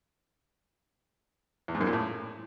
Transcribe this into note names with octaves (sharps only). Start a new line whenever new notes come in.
E2
G#2
F#2
A#2
A2